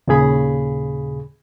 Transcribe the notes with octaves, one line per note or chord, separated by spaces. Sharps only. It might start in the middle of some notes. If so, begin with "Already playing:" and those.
D#2 A#2 C#3 G#4 B5